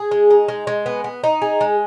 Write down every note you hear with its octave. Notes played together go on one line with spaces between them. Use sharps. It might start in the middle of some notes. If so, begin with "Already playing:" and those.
Already playing: G#4
G#3
D#4
G#3
G#3
B3
B3
D#4
G#4
G#3